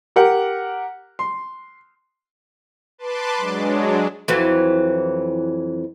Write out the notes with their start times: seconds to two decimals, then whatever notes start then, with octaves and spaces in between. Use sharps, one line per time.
0.16 G4 A#4 F#5
1.19 C6
2.98 B4 A5 C6 D6
3.37 F#3 G#3 D4
4.28 F2 E3 F#3